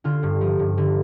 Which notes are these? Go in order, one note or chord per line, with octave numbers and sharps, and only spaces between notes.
D3 F4
G2
F3
G2
D3